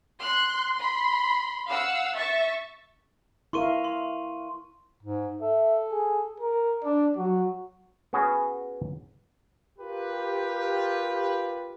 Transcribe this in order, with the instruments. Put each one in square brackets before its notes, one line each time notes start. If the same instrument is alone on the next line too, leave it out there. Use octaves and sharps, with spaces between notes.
[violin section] C6 F#6
B5 C6
F5 F#5 E6
E5 C#6 A6
[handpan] E4 A#4 F5 [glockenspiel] C6 C#6 D#7
[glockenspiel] C6
[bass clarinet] G#2
[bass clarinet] A4 [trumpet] E5
[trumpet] G#4
A#4
[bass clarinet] D4 [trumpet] D5
[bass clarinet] F#3 [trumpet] F#4
[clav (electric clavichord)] B3 C#4 F#4 G#4
[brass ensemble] F4 G4 A#4 B4